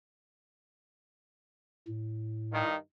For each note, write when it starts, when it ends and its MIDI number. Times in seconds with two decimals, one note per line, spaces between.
1.87 2.63 45
2.52 2.75 43
2.52 2.75 51